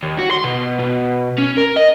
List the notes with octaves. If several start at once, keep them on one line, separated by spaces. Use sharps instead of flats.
D#2
F#4
C6
B2
B2
C#4
A#4
D#5